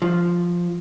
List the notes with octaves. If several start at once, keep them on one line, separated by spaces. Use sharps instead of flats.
F3